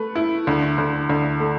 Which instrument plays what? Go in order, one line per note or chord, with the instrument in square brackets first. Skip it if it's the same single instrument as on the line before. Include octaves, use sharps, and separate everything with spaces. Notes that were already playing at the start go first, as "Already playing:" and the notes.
Already playing: [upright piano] A3 B4
E4
D2
D2
D2
A3